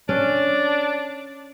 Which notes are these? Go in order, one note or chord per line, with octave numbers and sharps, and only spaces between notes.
C#4 D4